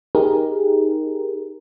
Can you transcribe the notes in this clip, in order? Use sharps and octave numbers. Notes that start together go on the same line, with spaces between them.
D#4 G4 G#4 A#4